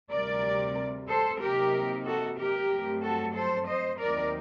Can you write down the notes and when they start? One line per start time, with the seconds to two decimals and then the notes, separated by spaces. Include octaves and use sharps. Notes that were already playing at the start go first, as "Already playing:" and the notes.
0.12 D2 C3 G3 A#4 D5
1.08 A4 C5
1.41 C3 F#3 A#3 D#4 G4 A#4
2.05 F#4 A4
2.38 G4 A#4
2.70 G2 F#3 A3 C4
3.02 F#4 A4
3.34 A4 C5
3.67 C5 D#5
3.99 D#2 D#3 F#3 C4 D#4 A#4 D5